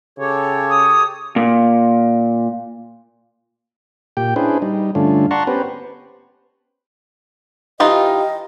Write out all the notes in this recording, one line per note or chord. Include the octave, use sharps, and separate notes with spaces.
C#3 G4 A4 C#5
D#6
A#2
A#2 G4 G5
C#4 D4 E4 G#4 B4 C5
G3 D#4
G2 D3 A3 C#4 D4 F4
D5 F#5 A5 A#5 C6 C#6
B3 C#4 G4 B4 C5
E3 D#4 F4 G4 D#5